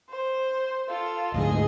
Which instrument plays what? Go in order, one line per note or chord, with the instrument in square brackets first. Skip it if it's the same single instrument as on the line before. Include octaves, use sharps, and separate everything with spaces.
[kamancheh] C5
F4 A4
[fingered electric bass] D2 G#2 [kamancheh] G#4 D#5